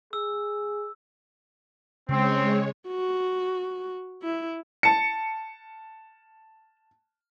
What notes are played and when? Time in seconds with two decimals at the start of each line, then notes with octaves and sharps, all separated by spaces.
0.13 G#4 E6
2.09 C#3 G#3 C4 C#5
2.89 F#4
4.23 E4
4.83 A5 C#7